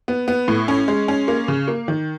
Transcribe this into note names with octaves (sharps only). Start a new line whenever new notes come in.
B3
B3
A2
C#4
G#3
C#4
A#3
C#3
A#3
D#3